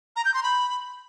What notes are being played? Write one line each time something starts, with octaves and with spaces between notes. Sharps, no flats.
A#5
G6
C6
B5